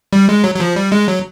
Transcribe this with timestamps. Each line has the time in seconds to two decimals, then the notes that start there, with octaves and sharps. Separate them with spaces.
0.13 G3
0.29 G#3
0.44 F#3
0.55 F#3
0.60 F3
0.76 G3
0.92 G#3
1.08 F#3